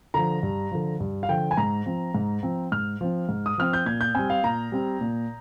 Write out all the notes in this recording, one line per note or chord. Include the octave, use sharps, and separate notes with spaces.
D3 F3 A#5
G2
D3 F3
G2
F5
D3 F3 G5
G#5
G#2 A#5
F3 C4
G#2
F3 C4
G#2 F6
F3 C4
G#2
D#6
F3 C4 F6
G6
A#2 G#6
G6
G3 C4 G#5
F5
A#2 A#5
G3 C4
A#2